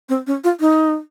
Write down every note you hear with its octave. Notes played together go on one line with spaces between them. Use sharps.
C4
C#4
F4
D#4